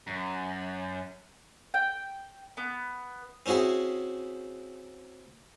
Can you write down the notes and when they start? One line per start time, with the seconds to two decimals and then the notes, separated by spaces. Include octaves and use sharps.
0.07 F#2
1.74 G5
2.57 B3
3.46 C4 C#4 E4 F#4 G#4